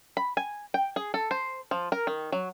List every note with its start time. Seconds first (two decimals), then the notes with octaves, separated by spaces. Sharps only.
0.17 B5
0.37 G#5
0.74 G5
0.96 G#4
1.14 A4
1.31 C5
1.71 F3
1.92 A#4
2.07 D#3
2.32 F#3